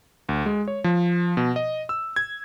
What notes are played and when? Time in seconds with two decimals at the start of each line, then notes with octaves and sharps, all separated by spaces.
0.29 D2
0.46 G#3
0.68 C#5
0.84 F3
1.37 B2
1.56 D#5
1.89 E6
2.16 G#6